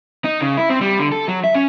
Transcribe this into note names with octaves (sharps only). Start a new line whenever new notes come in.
D#4
C#3
E4
C4
G3
D3
A4
F#3
E5
C#4